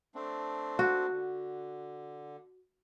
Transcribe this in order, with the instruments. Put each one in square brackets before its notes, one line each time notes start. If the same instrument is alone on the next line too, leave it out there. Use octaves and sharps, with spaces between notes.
[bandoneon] A3 C4 D4
[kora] F#4
[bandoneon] D3